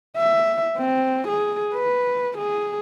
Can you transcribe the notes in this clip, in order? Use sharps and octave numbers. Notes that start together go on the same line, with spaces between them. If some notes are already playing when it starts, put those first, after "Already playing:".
E5
C4
G#4
B4
G#4